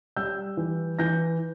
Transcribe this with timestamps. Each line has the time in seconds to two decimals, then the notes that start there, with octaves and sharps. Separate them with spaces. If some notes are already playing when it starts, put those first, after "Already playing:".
0.16 G3 E6 G6
0.57 E3
0.99 E3 G6 A#6